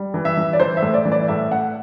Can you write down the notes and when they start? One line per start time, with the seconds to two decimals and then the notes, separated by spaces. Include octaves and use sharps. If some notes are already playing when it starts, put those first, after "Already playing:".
Already playing: G3
0.14 E3
0.25 E5
0.37 E3
0.53 D5
0.60 E3 C5
0.77 E5
0.82 A2
0.94 D5
1.05 E3
1.12 D5
1.28 A2 E5
1.52 A3 F#5